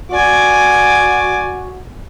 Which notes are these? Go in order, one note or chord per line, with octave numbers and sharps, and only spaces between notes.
F#4 D5 G#5